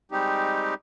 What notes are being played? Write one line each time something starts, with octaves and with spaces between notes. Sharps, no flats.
G3 G#3 C4 D#4 G4